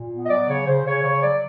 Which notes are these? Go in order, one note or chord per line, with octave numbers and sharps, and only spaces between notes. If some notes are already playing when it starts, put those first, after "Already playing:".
Already playing: A#2
B3
D#5
F#3 D5
C#3 C#5
C#3 C5
C#3 C#5
C#3 C#5
F#3 D5